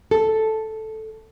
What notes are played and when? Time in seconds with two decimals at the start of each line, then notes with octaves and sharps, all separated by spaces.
0.11 A4